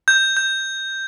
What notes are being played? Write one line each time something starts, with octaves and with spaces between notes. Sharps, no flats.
G6
G6